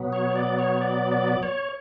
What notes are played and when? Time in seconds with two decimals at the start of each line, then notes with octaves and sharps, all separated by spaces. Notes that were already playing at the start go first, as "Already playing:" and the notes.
Already playing: B2 F#3 B3
0.13 C#5
0.36 D5
0.58 C#5
0.81 D5
1.12 D5
1.43 C#5